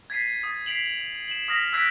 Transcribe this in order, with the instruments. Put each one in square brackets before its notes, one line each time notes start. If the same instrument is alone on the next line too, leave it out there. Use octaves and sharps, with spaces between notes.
[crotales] G#6 A6 B6 C7 D#7
D#6 A6
B6 C7 D7 F7 F#7
E7 F#7
D#6 F6 A#6 B6 F7
E6 F#6 G#6 B6 D7